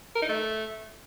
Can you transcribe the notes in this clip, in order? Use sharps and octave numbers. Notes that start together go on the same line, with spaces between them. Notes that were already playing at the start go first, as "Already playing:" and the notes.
A#4
D#4
A3